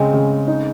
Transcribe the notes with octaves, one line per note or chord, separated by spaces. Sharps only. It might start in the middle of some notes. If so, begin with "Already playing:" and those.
Already playing: C#3 G#3 C4
C#3
D#4